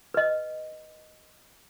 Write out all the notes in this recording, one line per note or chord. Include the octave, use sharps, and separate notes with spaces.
B4 D#5